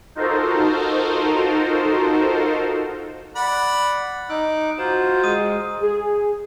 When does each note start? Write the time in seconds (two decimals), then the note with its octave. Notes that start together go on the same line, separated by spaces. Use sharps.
0.15 D#4 F4 F#4 A4 A#4 C5
3.36 D5 F#5 B5
4.29 D#4 D6 E6 F#6
4.78 F4 F#4 C5 A#5
5.24 G#3 D#6 D#7
5.80 G#4